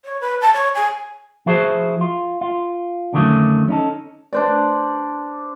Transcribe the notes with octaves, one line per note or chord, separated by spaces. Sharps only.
C#5
B4
A5
C#5
G#5
F3 E4 F#4 G#4 C5
F4
F4
F2 D3 D#3 F#3 A3 C#4
C#4 D#4 A4
D4 C5 D5